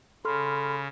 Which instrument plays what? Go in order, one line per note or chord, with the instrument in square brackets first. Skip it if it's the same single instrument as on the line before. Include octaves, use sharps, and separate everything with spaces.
[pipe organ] C#3 [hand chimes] A4 C6 F6 [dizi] B5